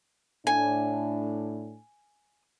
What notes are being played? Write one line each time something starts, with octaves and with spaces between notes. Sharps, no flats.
A2 D4 G#5